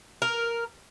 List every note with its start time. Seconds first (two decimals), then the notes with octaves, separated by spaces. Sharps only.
0.22 A#4